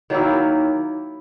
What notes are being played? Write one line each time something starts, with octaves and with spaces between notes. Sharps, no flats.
D#3 F#3 A#3 E4